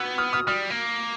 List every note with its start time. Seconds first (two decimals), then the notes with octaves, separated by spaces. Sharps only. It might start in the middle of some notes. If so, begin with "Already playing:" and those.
Already playing: B3 E6 F#6 G#6
0.18 D#6 F6
0.33 D#6 F6
0.47 G3 D#6 F6
0.70 A#3